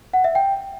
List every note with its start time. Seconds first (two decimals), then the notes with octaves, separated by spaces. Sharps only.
0.13 F#5
0.24 E5
0.35 G5